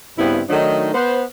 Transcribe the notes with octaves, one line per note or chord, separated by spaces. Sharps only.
G2 C#3 B3 C4 E4
D#3 F#3 A3 D4 D#4
B3 B4 C5